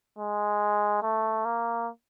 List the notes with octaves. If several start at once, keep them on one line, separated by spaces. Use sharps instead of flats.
G#3
A3
A#3